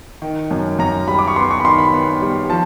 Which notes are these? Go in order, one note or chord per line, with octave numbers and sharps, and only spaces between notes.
D#3
F#2
F#2 A#5
G3 B5
D6
C#6
B3 C6
C#6
B5
D#3 C6
B5
B3
G3
F3 A5